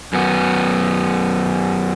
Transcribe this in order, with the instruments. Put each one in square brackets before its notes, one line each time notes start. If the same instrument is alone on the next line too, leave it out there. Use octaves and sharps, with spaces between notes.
[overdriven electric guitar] F#2 B3